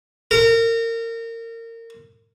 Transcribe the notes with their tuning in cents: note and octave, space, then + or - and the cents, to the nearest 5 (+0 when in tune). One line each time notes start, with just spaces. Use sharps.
A#4 -30